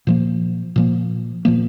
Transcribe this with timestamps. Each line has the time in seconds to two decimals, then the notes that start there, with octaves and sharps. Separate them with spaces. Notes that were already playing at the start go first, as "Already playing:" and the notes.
0.07 A#2 F3 A#3
0.76 A#2 F3 A#3
1.45 A#2 F3 A#3